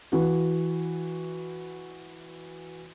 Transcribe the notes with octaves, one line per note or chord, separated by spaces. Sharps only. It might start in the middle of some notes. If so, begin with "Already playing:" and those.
E3 F#4